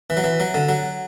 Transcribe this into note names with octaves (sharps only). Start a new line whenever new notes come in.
E3
F#3
E3
F#3
D3
F#3